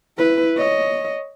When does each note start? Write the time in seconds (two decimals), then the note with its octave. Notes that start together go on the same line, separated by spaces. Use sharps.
0.17 E4 B4
0.57 C#5 D#5